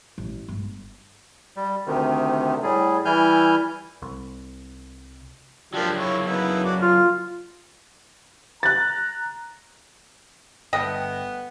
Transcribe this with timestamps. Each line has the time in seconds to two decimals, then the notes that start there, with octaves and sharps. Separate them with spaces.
0.18 A1
0.48 G1
1.57 G3
1.86 D2 C3 D#3
2.63 A2 G3 G#4
3.05 E3 G3 E4 G#5 F6 G6
4.02 C2
5.74 F3 F#3 A#3 D4 G4
5.97 E4 C#5
6.26 B3 D#4 E4
6.64 F#4 D5
6.82 F4 F6
8.63 A#5 F#6 A6
10.73 G1 G3 A3 B3 D#5 G5